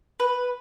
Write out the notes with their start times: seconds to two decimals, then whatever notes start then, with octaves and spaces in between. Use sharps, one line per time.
0.20 B4